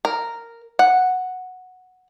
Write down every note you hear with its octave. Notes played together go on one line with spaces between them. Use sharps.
A#4
F#5